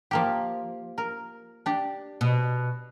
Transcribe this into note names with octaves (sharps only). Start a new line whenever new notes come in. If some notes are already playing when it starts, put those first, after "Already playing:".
F3 A#3 G4
A#4
D4 G4
B2